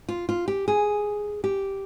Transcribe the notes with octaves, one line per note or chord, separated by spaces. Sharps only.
F4
F4
G4
G#4
G4